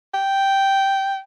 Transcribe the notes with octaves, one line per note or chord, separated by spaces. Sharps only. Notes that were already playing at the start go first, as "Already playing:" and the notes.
G5